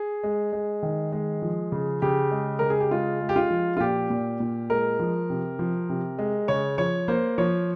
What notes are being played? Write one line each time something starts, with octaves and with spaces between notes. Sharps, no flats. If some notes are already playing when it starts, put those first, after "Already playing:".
Already playing: G#4
G#3
G#3
D#3
G#3
F3
C#3
C#3 G4
G#3
C#3 A#4
G#4
G4
G#3 F4
G#3
G4
F4
F3
F4
A#2 G4
A#2
A#2
G#3 A#4
F3
C3
F3
C3
G#3
C#3 C#5
F3 C#5
A#3 C5
F3 C#5